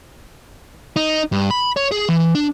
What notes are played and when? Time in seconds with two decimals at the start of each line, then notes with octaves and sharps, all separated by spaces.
0.96 D#4
1.32 G2
1.51 B5
1.76 C#5
1.92 G#4
2.09 E3
2.35 D4